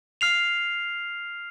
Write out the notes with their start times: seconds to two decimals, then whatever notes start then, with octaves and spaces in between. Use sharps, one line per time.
0.21 F6 C7 F7